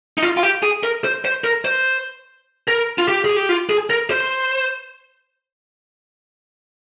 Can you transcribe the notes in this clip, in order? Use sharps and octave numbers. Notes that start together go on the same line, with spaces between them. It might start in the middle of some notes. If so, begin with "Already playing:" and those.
D#4
F4
F4
G4
G#4
A#4
C5
C5
A#4
C5
A#4
F4
G4
G#4
G4
F4
G#4
A#4
C5